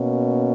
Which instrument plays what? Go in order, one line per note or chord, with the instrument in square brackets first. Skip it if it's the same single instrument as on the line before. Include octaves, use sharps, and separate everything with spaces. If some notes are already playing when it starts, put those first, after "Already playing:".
Already playing: [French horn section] B2 A#3 C#4